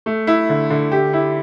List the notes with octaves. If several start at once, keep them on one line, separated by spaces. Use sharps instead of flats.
A3
E4
D3
D3
G4
E4